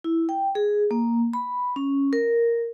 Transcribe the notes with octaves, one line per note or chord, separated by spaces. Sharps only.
E4
G5
G#4
A#3
B5
C#4
A#4